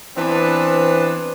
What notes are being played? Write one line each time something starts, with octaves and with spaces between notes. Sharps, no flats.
E3 B3 C4 D4